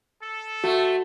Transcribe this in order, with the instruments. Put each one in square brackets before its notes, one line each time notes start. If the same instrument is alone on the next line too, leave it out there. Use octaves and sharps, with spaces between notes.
[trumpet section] A4
[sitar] A3 [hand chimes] F#4